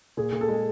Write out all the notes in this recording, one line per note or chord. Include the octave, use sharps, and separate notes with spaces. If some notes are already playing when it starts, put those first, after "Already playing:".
A#2 G#4
A#2
A4
G#3